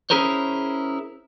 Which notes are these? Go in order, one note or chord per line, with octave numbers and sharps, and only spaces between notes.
C#4 E4 G#4 A#4 C5 C#5